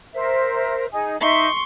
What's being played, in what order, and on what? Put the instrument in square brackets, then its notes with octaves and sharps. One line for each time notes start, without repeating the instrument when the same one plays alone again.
[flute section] A#4 C5 E5
D#4 G#4
[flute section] D#4 E5 [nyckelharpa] C6 C#6